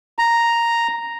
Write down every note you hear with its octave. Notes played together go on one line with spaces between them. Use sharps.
A#5